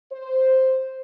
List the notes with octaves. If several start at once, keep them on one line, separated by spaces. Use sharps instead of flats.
C5